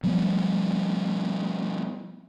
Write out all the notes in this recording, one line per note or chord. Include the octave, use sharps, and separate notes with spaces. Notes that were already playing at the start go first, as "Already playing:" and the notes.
F3 G3 A3 B3